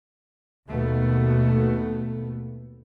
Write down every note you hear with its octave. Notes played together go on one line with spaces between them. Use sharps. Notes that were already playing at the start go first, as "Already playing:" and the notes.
D#2 B2 A3 B3